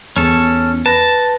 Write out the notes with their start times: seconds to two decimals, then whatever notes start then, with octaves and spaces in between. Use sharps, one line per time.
0.16 E2 C#4 A4
0.86 B4 A5 A#6